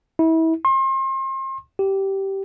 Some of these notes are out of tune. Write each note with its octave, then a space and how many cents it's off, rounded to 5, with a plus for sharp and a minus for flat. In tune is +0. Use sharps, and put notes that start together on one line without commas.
E4 -30
C6 +35
G4 -15